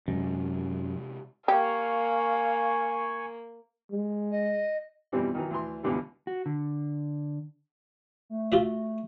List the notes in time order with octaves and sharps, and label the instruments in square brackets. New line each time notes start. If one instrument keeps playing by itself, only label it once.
[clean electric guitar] F#2 [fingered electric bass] C3 G#3 C#4
[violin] A#3 [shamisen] G4 [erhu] F5 [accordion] G#5 C#6
[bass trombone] G#3
[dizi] D#5
[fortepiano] F2 B2 E3 G3 C4 D4
D#3 E3 F#3
D2 E3 C6
C#2 F#2 B2 D3 E3 G3
[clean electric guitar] F#4
D3
[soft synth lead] A3
[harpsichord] F4 F#4 E5